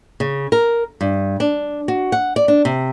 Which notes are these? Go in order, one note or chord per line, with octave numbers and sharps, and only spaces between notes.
C#3
A#4
G2
D4
F#4
F#5
D5
D4
C3